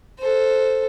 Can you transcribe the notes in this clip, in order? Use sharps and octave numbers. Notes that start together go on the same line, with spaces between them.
A4 C5